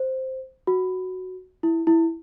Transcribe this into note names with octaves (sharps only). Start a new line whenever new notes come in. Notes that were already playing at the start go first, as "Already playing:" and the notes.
Already playing: C5
F#4
E4
E4